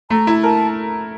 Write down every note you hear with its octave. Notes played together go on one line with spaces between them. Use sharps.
A3 A#5
E4
A#4 A5